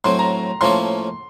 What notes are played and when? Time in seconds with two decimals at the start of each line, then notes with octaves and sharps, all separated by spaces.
0.04 A2 F#3 C4 C6
0.19 A#5
0.61 A2 F3 A#3 C#4 A4 C6